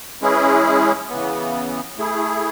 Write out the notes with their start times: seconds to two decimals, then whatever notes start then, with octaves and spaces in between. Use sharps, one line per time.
0.22 E3 G#3 C#4 E4 G#4
1.10 C#3 E3 B3
1.98 A3 E4 G#4